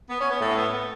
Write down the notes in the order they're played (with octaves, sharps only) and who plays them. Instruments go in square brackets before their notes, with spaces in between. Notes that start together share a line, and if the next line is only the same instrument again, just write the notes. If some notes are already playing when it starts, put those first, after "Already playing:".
[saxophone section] B3
C#4
B3
[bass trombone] A2 [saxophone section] A3
[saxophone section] C#4
B3
B3